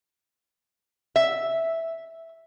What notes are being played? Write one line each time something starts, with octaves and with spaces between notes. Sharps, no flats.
E5